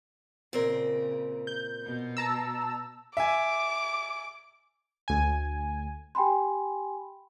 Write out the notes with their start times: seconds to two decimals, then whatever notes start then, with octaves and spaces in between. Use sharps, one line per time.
0.53 A#2 C#3 C4 A#4
1.47 G6
1.83 B2 B3
2.17 A5 A#5 E6
3.17 E5 G#5 D6
5.08 D2 G#5
6.15 G4 G5 G#5 B5 C6